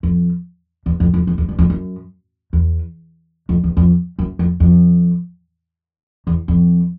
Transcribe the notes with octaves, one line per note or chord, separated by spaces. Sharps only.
F2
E2
F2
F2
F2
E2
G2
F2
F#2
E2
F2
E2
F2
F#2
F2
F2
E2
F2